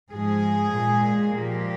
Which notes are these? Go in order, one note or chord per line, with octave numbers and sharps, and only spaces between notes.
G#2 F3 G#3 G#4
A#2 G#3
A#2 F3 A#3 G4